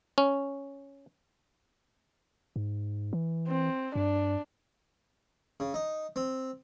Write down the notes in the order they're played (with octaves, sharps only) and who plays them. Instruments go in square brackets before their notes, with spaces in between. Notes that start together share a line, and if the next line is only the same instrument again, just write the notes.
[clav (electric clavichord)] C#4
[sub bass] G#2
E3
[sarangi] C4
[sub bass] G2 [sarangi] D4
[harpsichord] C#3
D#4
C4